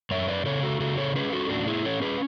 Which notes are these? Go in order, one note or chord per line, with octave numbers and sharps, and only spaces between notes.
F#2 C#5 E5
B4 D5
C#3 A4 C#5
F#4 A4
C#3 F#4 A4
A4 C#5
C#4 G#4 B4
F#4 A4
A2 D4 F#4
E4 G#4
C#4 A4 C#5
G#4 B4